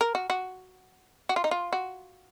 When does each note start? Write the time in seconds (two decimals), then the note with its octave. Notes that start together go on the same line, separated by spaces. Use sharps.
0.01 A#4
0.15 F#4
0.30 F#4
1.29 F#4
1.36 F4
1.44 D#4
1.51 F4
1.73 F#4